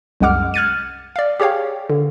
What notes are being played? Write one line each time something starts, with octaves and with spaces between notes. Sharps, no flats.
C2 F#2 G#3 F#5 D6 F6
F6 F#6 G#6 A6 C#7 D#7
D5 F5
G4 G#4 C#5 F5 G5
D3